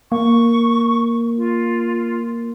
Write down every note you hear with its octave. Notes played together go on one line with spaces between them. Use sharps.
A#3 C#6
F4